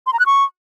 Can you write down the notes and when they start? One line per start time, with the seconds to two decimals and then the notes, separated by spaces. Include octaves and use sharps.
0.07 C6
0.13 A#5
0.19 F#6
0.26 C#6